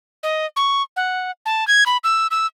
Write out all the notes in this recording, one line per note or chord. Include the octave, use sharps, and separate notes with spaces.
D#5
C#6
F#5
A5
G#6
B5
E6
E6